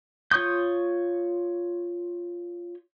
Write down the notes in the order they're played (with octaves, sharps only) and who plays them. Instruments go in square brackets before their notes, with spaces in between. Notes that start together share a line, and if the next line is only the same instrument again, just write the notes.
[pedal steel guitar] F4 C#5 C#6 D#6 G6